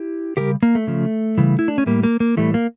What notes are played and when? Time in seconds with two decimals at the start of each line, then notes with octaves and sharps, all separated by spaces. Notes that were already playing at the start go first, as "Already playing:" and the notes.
Already playing: E4 G4
0.37 C#3 G3 G4 A#4
0.63 A#3
0.75 A3
0.87 C#3 F3
1.38 C#3 E3 G3
1.59 E4
1.68 D4
1.78 C#4
1.86 A2 G3 A#3
2.03 A#3
2.20 A#3
2.37 A2 E3 G3 A3
2.54 A#3